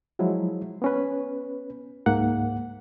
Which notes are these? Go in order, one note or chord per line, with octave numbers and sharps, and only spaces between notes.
F3 F#3 G#3 E4
B3 C#4 B4
C#2 G#2 A#3 F#5